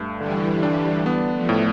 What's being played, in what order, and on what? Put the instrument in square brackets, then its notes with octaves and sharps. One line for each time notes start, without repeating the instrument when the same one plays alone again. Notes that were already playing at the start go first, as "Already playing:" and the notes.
Already playing: [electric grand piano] G2 A3
[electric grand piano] D3 [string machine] E3 G3
[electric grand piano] D4
B3
[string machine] F3 A3
[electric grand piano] A2